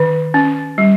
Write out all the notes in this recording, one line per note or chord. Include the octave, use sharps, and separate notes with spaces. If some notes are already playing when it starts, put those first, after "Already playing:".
Already playing: D#3
C#4
G3